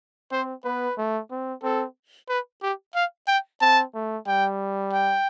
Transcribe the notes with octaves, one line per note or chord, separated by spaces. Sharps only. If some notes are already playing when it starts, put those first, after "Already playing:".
C4 C5
B3 B4
A3
C4
C4 A4
B4
G4
F5
G5
C4 A5
A3
G3 G5
G5